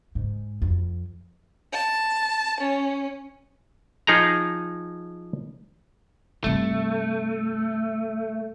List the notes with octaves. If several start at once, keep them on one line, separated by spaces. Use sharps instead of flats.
G#2
F2
A5
C#4
F3 D#4 G#4 G5 A#5
G2 C3 A3